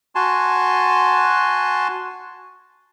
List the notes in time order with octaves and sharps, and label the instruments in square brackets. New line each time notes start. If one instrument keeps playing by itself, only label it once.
[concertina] F#4 G#5 A5 C6